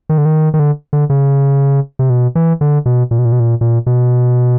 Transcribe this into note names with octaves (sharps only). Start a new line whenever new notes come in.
D#3
D3
D#3
D#3
D3
D3
C#3
C3
B2
E3
D3
B2
A#2
B2
A#2
B2
A#2
A#2
B2